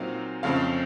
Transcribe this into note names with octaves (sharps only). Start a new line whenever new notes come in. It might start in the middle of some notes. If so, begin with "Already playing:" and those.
Already playing: A#2 F#3 C4 D#4 F5
F2 C#3 A3 C4 F5